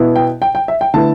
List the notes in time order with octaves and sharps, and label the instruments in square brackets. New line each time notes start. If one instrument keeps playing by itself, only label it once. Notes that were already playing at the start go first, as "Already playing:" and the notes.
Already playing: [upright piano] B2 B3 E4
[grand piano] G5
G5
G5
E5
G5
[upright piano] D3 A3 E4 B4 [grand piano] A5